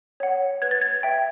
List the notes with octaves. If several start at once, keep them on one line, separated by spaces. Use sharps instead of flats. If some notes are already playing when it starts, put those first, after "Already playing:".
C#5 F#5
B4 G#6
A6
G#6
E5 G5